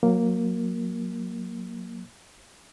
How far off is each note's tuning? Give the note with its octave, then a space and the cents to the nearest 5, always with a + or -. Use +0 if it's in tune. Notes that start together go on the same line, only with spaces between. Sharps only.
F#3 -20 A#3 +0